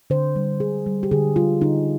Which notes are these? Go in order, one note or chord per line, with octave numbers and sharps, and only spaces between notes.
D3 C5
G3
D3 G#4
G3
G4
D3 G#4
G3 F4
D3 D#4